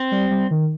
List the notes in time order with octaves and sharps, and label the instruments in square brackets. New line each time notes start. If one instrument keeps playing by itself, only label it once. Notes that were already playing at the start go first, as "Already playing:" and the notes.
Already playing: [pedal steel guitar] C4
[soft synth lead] G3
G3
D#3